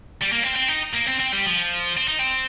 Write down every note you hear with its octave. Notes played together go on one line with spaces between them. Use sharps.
G3
A#3
C4
C4
D#4
A#3
C4
C4
G3
F3
C4
D#4
C4